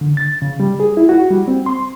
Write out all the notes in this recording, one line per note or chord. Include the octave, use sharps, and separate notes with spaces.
D3
A6
C#3
G3
G#4
E4
F#4
G3
C4
C6